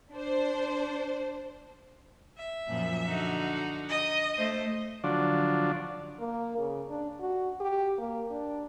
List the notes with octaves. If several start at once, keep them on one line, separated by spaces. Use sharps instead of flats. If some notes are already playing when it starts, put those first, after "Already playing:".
D4 C5
E5
F#2 A#2 F3
D3 D#4 F#4
D#5
A3 C5 D#5
D3 F3 F#3 D4
A#3
C#3
D4
F#4
G4
A#3
D4